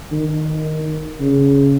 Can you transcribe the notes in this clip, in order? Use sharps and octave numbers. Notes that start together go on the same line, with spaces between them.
D#3
C#3